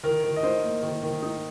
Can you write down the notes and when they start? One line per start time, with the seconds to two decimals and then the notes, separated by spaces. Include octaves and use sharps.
0.04 D#3 A#4
0.24 D#3
0.36 D#5
0.43 D#4 C5
0.63 A#3
0.83 D#3
1.03 D#3
1.22 D#4